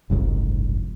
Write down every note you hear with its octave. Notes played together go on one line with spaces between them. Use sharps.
F#1 C2 F2 G#2